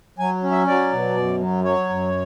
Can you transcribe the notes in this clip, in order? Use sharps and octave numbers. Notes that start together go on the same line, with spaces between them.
F#3 G#5
C#4
E5
F#3 D5
B2
F#2
F#3
F#3 C#5
F#2